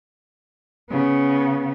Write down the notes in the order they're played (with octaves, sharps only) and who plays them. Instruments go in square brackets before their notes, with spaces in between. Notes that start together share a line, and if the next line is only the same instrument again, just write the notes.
[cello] C#3 B3